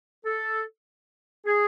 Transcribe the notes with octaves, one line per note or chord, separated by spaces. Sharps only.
A4
G#4